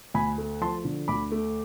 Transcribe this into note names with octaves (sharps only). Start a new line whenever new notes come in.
D2 G#5 B5
A3
F3 A5 C6
D3
D2 B5 D6
A3